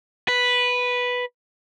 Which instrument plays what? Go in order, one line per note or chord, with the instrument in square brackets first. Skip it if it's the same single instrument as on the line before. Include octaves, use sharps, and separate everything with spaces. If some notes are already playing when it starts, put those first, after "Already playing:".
[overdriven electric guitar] B4